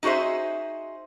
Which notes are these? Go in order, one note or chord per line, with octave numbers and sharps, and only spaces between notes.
D#4 F#4 G#4 C5 E5